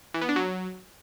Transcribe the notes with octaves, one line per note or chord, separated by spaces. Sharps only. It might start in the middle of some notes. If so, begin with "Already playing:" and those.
E3
B3
D4
F#3